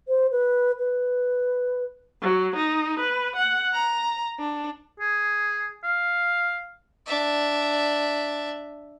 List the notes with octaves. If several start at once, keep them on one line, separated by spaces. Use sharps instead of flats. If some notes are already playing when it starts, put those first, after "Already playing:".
C5
B4
B4
F#3
D#4
B4
F#5
A#5
D4
G#4
F5
D4 E5